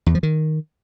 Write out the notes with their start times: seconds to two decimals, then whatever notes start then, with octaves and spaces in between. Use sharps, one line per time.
0.06 E2
0.15 F3
0.23 D#3